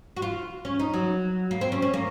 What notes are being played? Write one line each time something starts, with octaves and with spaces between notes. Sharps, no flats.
F#4
F4
C#4
D#4
F#3
A#3
C4
C#4
C#4
A#3